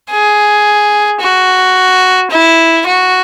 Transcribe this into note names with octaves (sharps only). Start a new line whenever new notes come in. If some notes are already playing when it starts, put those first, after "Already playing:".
G#4
F#4
E4
F#4